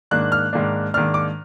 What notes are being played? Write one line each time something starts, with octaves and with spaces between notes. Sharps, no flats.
G#2 D#3 A#3 D4 F#6
F6
G#2 D#3 A#3 D4
G#2 D#3 A#3 D4 F6
D6